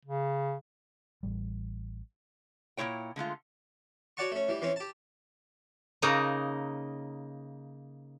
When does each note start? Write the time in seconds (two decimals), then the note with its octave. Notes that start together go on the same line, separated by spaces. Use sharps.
0.05 C#3
1.23 A1 G3
2.77 A#2 C4 E4 C#5 G5
3.16 D3 G#3 A3 F4
4.17 F#4 C#5 D5 F#5 A5 C#6
4.32 A3 C#4
4.48 E3 G3
4.62 E3 C4 C#4
4.76 G4 A5
6.02 C#3 A#3 D#4 A#5